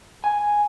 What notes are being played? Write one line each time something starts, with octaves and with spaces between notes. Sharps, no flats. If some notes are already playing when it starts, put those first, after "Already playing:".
G#5